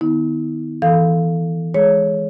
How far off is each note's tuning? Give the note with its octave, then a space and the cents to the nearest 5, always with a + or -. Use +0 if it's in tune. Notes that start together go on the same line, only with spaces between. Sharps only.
D#3 -35 B3 +0 E4 -45
E3 +0 A4 +0 F5 +0
G#3 +0 G#4 +0 C#5 +0